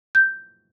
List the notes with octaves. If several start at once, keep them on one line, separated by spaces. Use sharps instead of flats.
G6